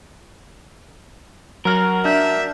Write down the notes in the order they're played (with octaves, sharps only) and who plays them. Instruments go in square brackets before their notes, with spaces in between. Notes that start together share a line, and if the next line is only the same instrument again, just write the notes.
[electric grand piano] F#3 F6 [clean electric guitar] F#4 A#4
[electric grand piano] D4 G6 [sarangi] E5